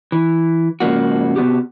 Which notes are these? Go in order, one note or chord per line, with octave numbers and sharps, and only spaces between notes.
E3
G#2 C#3 F3 A#3 F#4
C3 F3 B3 F#4 G4